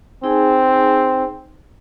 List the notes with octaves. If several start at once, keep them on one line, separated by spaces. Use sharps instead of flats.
C4 D#4 G#4 G#5